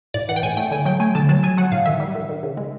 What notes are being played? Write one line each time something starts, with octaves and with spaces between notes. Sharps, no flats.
A2 D5
E3 F#5
G5
A2 G#5
A3 G5
D3 G#5
F#3 G5
A3 G#5
D3 A5
F#3 A5
F#3 G#5
F#3 F#5
A2 F5
D#3 E5
G3
D#3
D#3
C#3
G#3